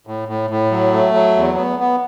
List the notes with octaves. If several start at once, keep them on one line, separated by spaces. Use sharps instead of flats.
A2
A2
A2
F#3
A3
F#3
E2
B3
B3